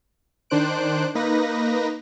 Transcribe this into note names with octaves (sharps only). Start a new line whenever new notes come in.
D#3 D4 C5 F#6 D7
A#3 D#4 B4 A#6